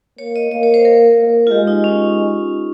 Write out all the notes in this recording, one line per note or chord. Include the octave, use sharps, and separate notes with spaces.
A#3 C#5
D#5
A#3 D#5
C#5
C5
A#4
A#3
F4
G#3 G4
D#4
C#4